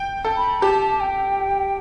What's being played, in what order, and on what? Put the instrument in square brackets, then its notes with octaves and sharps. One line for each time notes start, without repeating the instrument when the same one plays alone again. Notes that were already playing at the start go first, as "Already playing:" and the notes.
Already playing: [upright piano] G5
A4
[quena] B5
[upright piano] G4 [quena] A5
[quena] G5